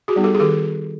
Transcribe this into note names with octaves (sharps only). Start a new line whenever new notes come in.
F#4 G#4
G3 B3 D#4
G4 A4
G#4
D#3 G4 A4